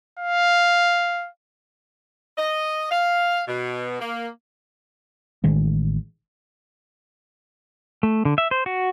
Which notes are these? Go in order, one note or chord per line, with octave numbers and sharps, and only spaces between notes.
F5
D#5
F5
B2
A#3
A1 D#3 G#3
A3
D3
E5
C5
F#4